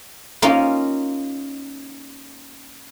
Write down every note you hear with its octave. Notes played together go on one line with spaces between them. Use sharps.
A#3 C#4 D#4 F4